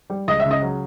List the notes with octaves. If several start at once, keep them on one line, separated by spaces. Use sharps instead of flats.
G3
C#2 D#5
E5
C#3
D#5
F#3